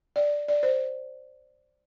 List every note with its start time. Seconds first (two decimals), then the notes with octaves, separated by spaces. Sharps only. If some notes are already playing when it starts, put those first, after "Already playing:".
0.16 D5
0.48 D5
0.63 C5